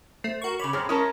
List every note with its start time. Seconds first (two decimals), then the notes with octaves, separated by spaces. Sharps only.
0.24 A3 C5 C7
0.42 F#4 A#4 C#6
0.59 C#3 C#5 B5 D6
0.73 F#2 A2 C4 G#4 C#5 F6
0.89 G#3 C#4 E4 A#4 C#5 A5 C#6 D#6